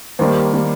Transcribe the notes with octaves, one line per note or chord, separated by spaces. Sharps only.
D#2 D#3 G3 A#3 C5
D#3 G3 A#3